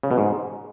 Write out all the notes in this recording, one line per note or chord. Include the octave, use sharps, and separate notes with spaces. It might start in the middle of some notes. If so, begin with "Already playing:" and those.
C#3
B2
G#2